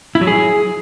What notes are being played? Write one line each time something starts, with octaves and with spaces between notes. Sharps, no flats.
E4
F#3
G#4